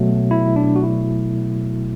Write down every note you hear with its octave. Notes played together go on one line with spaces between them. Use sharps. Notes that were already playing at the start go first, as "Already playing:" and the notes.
Already playing: B2 F#3 A3
E4
D4
F#4
E4